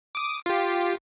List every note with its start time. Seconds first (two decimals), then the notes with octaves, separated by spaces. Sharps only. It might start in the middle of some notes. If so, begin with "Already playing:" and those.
0.15 D6 D#6
0.46 F4 G4